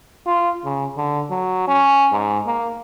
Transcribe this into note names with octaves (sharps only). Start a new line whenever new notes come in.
F4
C#3
D3
F#3
C#4
G#2
A#3